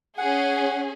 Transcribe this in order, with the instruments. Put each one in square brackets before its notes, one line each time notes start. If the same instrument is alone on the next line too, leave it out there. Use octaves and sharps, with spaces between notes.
[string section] C#4 G#4 [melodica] F#5